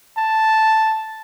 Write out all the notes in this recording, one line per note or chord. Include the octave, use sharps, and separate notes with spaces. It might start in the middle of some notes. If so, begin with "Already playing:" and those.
A5